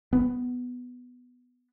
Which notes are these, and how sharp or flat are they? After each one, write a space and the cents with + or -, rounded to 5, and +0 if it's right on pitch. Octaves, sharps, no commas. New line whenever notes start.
B3 +5